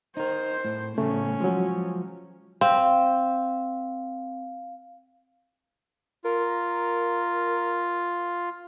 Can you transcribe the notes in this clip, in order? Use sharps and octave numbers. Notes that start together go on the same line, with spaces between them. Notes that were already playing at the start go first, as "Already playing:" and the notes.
D#4 A#4 C5
A2
A2 C#3 A3 C#4
F3 F#3 G#3
C4 F5
F4 A#4